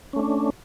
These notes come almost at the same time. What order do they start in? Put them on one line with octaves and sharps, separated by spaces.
C#4 A3 D4